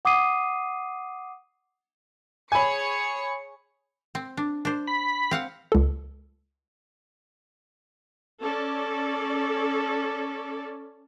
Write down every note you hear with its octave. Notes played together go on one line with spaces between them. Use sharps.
F#5 D6 D#6 C7 D#7
G#4 C#5 G#5 B5 C#7
C4
D4
D4 C5
B5
C4 F5 F#5
C#2 A4
C#4 A4 D5